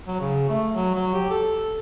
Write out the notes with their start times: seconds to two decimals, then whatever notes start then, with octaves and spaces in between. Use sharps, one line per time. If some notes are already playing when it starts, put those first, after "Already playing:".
0.07 F#3
0.20 C#3
0.49 A3
0.74 F#3
0.95 F#3
1.14 G4
1.30 A4